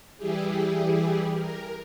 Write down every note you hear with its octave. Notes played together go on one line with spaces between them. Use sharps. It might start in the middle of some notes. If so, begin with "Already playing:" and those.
E3 G3 E4 G4 G#4
A#4